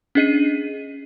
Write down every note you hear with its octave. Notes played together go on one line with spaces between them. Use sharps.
C#4 D4 G#4 D#5 C7 D#7